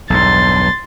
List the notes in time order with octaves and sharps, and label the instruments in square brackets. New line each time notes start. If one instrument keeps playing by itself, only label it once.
[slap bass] B1 E2 G2 [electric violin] C6 A6